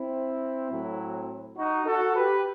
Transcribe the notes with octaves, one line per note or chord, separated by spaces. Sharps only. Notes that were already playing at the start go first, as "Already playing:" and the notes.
Already playing: C4 E4
A2 F#3 C4
D#4 F#4
F#4 A4
G4 B4